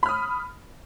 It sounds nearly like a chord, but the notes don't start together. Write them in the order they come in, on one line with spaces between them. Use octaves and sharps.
B5 F6 D#6